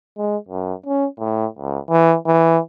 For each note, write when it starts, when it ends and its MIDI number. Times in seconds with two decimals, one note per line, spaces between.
0.18 0.37 56
0.48 0.74 42
0.87 1.07 61
1.19 1.46 45
1.58 1.78 37
1.89 2.16 52
2.26 2.59 52